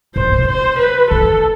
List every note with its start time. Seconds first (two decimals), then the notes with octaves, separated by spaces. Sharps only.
0.15 B2 C5
0.32 C3
0.48 C5
0.79 B4
1.11 D3 A4